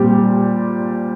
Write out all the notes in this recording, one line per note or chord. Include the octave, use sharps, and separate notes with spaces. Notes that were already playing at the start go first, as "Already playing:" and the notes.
Already playing: A#2 G3 C4 G4